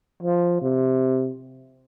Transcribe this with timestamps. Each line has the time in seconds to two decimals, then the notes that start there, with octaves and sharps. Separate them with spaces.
0.23 F3
0.62 C3